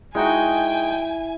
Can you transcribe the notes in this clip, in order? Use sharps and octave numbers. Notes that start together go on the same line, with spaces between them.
G#3 D#4 E4 F#4 G5 G#5